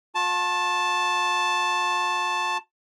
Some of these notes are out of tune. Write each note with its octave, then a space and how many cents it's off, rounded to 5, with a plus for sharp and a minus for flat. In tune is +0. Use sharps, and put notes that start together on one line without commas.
F4 +45 A5 +0